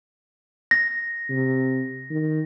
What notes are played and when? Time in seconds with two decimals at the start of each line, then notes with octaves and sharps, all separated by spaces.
0.71 A#6
1.29 C3
2.10 D#3